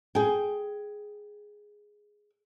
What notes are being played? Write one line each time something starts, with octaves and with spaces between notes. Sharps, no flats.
G#4 G5